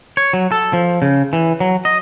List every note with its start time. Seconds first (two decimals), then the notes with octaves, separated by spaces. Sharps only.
0.17 C#5
0.33 F#3
0.52 A4
0.73 F3
1.02 C#3
1.33 E3
1.60 F#3
1.85 D#5